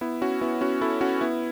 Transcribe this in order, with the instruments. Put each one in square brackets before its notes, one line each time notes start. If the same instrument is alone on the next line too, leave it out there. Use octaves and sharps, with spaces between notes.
[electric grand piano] B3 E4
C#4 F#4
B3 E4
C#4 F#4
E4 A4
C#4 F#4
B3 E4